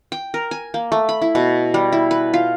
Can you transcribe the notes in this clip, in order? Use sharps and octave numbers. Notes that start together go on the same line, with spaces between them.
G5
A#4
G#5
A#3
A3
B5
E4
B2
G3
E4
B4
F4